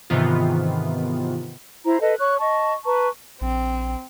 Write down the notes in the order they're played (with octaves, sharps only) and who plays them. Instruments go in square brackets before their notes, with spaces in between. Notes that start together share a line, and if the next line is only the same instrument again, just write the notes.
[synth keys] G#2 C3 D#3 E3 B3 F4
[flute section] E4 C5 A#5
A4 B4 D#5
C#5 C#6 F#6
D#5 A5 C#6
B4 A5 A#5 C#6
[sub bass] A#1 [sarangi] C4